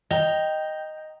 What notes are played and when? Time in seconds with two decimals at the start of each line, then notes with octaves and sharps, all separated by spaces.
0.11 D#5 G5 A#5